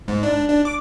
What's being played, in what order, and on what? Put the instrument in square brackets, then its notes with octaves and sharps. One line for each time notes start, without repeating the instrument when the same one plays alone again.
[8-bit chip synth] G#2
D4
D4
D6